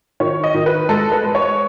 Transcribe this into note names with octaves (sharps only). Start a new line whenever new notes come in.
D#3 C#5
D#5
D#3
B4
G#3 A4
B4
G#3
C#5